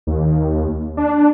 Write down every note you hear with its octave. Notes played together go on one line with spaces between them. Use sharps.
D#2
D4